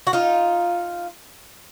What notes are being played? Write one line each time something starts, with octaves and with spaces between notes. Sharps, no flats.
F#4
D#4 F4